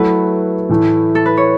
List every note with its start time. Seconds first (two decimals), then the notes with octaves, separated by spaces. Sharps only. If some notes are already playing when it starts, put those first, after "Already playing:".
Already playing: F#3 A3 E4 A4 B4
0.69 A2 E3 A3 E4
1.15 A4
1.26 B4
1.37 C#5